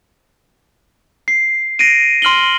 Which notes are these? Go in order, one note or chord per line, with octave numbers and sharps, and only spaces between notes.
C7
A#6 C7 D7 D#7
C6 F6 F#7 G7